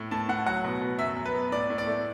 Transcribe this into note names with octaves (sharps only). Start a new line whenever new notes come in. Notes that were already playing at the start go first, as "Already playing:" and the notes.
Already playing: A2
A2 A5
A2 F#5
F#3 F#5
B2
B2
F#2 E5
F#2
B4
B3
A2 D5
A2
D5
A3